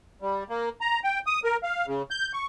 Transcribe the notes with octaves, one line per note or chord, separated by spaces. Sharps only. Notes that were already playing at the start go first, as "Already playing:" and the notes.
G3
A#3
A#5
G5
D#6
A#4
F5
C#3
G6
C#6